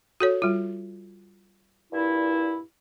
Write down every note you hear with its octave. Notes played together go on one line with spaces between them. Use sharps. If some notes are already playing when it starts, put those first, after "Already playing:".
F#4 A4 C#5
G3 F4
G2 A#2 E4